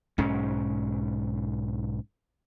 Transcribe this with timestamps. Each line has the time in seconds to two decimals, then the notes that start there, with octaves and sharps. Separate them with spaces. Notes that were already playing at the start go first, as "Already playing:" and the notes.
0.18 B1 G#2 C#4